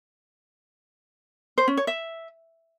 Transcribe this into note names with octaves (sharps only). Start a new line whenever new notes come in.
C5
C#4
C#5
E5